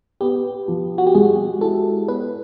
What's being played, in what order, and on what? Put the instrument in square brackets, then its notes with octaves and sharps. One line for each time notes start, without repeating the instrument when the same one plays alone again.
[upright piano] B3 [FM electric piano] G4
[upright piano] F3
[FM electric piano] F#4
G4
[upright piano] G#3 [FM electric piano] G#4
[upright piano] E4 [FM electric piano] A4
[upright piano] B3 [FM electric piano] B4